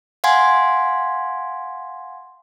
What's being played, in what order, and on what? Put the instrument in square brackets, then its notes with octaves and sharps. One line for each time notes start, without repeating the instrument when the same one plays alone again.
[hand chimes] F5 F#5 G#5 C6 G#6